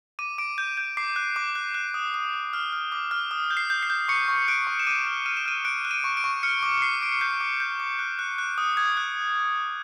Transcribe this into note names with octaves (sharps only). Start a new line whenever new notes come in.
D6 D#7
D6 D7
G6
G6
D6 C7
F#6
D6
F#6
F#6
D#6
D#6
F#6
F6
F6
D6
F6
D#6
G6
C7
G6
C7
G6
C#6 C#7
C#6
F#6 D7
C#6
E7
D6 D#7
F6
F6 D#7
E7
F6 D#7
F#6 D7
F#6
D#7
C#6
D7
C#6
F6 C#7
D6
D6 C7
D6 D7
C#7
G6 C7
D6
G6
D6
F#6
F#6
F#6
D#6
D#6 G#6
F#6